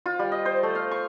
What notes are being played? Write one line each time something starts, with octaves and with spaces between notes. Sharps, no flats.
F4
G3
D#5
C5
A3
F5
C#6